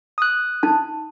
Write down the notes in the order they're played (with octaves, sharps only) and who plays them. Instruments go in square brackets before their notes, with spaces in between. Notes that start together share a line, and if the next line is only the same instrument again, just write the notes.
[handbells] D#6 F#6
[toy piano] D#4 A5